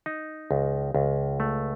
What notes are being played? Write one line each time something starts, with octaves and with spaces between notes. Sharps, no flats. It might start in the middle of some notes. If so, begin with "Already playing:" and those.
D#4
C#2
C#2
A3